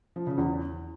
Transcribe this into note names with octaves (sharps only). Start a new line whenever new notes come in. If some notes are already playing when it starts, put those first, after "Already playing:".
F3
C#3
E2